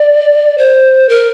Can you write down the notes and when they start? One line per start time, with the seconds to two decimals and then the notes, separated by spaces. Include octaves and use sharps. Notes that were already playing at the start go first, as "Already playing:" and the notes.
Already playing: D5
0.58 C5
1.09 A#4